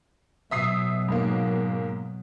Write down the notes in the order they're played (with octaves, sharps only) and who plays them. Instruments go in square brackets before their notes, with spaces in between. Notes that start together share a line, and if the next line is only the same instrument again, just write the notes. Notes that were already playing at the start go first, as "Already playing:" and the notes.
[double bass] B2 F#3 [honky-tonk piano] E5 D#6 C7
[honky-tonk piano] G#2 A#3